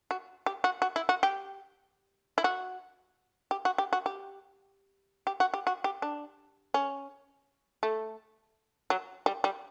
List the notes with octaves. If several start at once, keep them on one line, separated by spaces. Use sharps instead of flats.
F#4
G4
F#4
F#4
E4
F#4
G4
E4
F#4
G4
F#4
G4
F#4
G4
G4
F#4
G4
F#4
G4
D4
C#4
A3
F#3
G3
G3